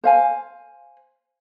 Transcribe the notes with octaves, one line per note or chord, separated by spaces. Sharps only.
C5 F5 G#5